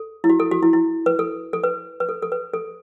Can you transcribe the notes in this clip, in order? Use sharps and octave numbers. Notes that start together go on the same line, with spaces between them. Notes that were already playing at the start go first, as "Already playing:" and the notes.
Already playing: A4
E4
F#4
A4
F#4
E4
E4
B4
A4
A4
B4
B4
A4
A4
B4
A4